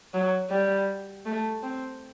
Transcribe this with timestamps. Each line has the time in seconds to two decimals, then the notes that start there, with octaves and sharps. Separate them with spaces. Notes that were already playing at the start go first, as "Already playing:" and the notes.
0.14 F#3
0.51 G3
1.26 A3
1.64 C4